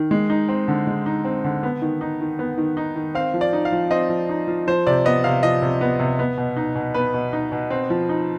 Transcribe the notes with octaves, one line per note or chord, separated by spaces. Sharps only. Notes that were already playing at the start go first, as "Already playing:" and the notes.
Already playing: D#3
G#3
D#4
C4
D3
G#3
D#4
C4
D3
B3
D#3
D#4
D#3
B3
D#3
D#4
D#3
C4 F5
F3
D5
D#4
F5
F3
C4 D#5
F3
D#4
F3
F3 C5
C3 D5
B3 D#5
C3 F5
F3 D#5
C3
B3
C3
B3
B2
D#4
B2
B3 B4
B2
D#4
B2
C4
F3
D#4